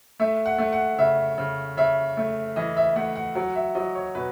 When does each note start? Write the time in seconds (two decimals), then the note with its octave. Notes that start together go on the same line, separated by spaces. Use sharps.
0.20 A3 E5
0.46 F#5
0.58 A3
0.73 F#5
0.99 C#3 E5
1.38 C#3
1.77 C#3 E5
2.17 A3
2.56 E3 D#5
2.77 E5
2.96 A3 F#5
3.16 F#5
3.35 F#3 F#5
3.55 E5
3.75 F#3 D#5
3.95 C#5
4.15 B2 B4